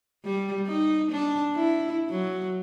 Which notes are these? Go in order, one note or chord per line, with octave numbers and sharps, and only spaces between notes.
G3
D#4
D4
E4
F#3